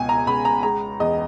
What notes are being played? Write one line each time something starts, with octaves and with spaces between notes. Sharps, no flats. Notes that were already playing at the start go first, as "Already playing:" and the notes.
Already playing: C#2 B2 G#5
A#5
C#2 B5
A#5
G#3 A#5
E2 D#5